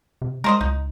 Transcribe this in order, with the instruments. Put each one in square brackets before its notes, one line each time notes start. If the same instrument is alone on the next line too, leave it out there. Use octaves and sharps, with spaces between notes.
[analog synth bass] C3
[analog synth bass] G#3 [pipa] A#4 C5 D#5
[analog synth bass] C#2 [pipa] D#4